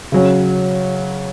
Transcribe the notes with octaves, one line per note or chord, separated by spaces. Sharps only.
C#3 F#3 C#4